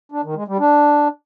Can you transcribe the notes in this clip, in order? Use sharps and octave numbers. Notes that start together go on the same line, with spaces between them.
D4
D#3
G#3
G3
D4